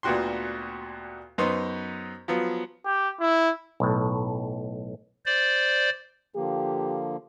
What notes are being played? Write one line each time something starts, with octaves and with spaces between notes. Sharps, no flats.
D2 A#2 B3 F#4 G4 C6
F#2 B3 D#4 C5
F3 F#3 B3
G4
E4
B1 A2
C5 D5
D3 F3 A#3 G4